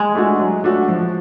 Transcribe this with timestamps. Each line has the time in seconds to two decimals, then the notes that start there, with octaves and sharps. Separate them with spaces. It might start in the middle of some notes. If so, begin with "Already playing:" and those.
Already playing: G#3
0.15 A3 D4 F#4
0.39 F#3
0.64 A3 D4 F#4
0.88 F3